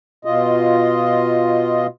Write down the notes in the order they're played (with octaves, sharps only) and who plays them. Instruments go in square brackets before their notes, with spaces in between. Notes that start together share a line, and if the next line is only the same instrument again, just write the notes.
[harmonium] B2 F4 D#5